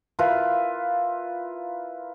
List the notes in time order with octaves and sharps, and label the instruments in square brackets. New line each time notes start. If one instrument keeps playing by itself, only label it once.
[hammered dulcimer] E4 F4 A#4 B4